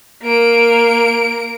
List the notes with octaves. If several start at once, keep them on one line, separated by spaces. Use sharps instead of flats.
A#3 D7